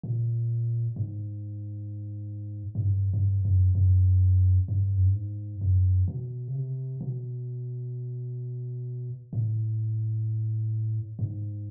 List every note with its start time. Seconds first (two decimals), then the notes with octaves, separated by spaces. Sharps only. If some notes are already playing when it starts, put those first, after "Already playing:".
0.03 A#2
0.96 G#2
2.75 G#2
2.82 G2
3.14 G2
3.45 F#2
3.75 F#2
4.68 G2
4.96 F#2
5.06 G2
5.14 G#2
5.61 F#2
6.08 B2
6.48 C#3
6.54 C3
7.01 B2
9.33 A2
11.19 G#2